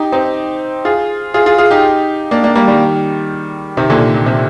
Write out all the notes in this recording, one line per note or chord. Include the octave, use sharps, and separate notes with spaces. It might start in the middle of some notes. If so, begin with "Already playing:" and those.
Already playing: D#4 G4
C4 D#4
F4 G#4
F4 G#4
F4 G#4
F4 G#4
D#4 G4
A#3 D4
A#3 D4
G3 A#3
D#3 G3
C3 D#3
A#2 D3
A#2
C3